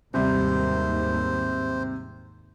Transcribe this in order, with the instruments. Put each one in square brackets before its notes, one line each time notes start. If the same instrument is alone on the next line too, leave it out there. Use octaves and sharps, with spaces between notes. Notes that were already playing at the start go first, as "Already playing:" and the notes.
[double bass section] D#2 G#2 [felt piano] C3 G3 [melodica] C5